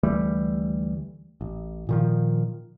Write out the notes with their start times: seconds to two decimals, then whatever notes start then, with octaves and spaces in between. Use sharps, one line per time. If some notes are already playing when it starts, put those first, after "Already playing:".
0.03 D2 E3 G3 A3
1.41 A1
1.89 A#2 D#3 F3